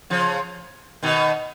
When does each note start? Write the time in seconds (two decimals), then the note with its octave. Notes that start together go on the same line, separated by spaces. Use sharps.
0.10 C#3 F3
1.03 B2 D#3